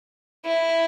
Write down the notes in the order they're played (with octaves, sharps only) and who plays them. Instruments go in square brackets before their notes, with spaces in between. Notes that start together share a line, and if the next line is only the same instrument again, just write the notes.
[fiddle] E4